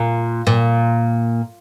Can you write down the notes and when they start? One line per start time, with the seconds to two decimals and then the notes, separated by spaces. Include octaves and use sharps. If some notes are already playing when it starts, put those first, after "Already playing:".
Already playing: A#2
0.47 A#2